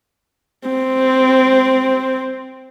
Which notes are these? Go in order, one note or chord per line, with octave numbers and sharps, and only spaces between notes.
C4